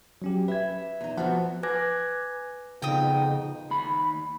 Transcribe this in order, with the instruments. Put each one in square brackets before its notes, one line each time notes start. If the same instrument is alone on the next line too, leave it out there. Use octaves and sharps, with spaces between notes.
[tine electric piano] F#3 C#4 G4
[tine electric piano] B4 G#6 [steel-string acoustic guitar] E5
[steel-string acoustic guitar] E2 D#4
[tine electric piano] F3 F#5 A5 [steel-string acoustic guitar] B3 C4 F#4
[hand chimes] B4 G#5 D6 F#6 G#6 A#6
[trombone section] F2 B3 D#4 [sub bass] C#3 [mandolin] G5 D#6
[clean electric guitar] D#2 B5